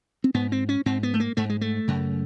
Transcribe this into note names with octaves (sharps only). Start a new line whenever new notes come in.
C4
G#2 B3
C4
C#4
G#2 C4
B3
A3
A#3
G#2 A3
G#3
A3
F#2 C#3